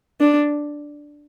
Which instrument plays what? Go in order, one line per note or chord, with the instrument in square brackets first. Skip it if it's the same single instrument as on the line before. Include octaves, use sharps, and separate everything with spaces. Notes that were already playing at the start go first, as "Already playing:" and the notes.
[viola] D4